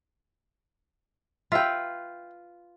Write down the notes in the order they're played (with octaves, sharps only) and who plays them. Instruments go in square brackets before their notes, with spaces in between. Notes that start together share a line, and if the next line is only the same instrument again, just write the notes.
[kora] F4 B4 [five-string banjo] E5 G5